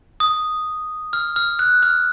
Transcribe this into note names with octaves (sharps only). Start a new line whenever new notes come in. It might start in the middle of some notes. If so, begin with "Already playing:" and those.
D#6
F6
F6
F#6
F6